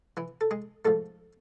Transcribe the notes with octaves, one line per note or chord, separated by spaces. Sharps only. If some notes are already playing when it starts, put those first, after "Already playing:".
E3 E4
A4
G#3 G#4
G#2 F3 A3 A4